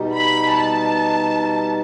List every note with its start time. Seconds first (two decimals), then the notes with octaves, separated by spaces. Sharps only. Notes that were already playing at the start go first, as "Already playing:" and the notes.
Already playing: B2 G3 D#4
0.13 B5
0.52 A5